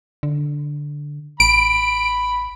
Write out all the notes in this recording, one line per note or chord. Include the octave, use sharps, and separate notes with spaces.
D3
A1 B5 D7